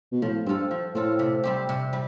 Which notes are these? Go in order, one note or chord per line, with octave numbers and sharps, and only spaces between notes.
B2
A2 F3
G2 C4 F4 A4
F3
A2 C4 F4 A4
C3
G3 C4 G4
C3
G3